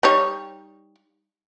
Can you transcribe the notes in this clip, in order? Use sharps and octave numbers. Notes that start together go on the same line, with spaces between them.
G3 D#4 C#5